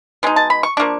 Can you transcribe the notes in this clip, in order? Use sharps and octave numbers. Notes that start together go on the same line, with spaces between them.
B2 G#3 D#4
A5
B5
C#6
F3 A#3 D4 C#6